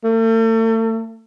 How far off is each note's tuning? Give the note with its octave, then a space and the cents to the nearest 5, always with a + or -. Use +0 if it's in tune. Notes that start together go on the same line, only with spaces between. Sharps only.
A3 +40